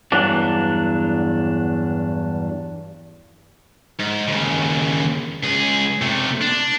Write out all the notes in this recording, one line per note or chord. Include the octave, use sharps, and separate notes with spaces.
E2 G2 F#3 D4
G#2
D#2 C#3
C#2 G#4
C3 A3
D4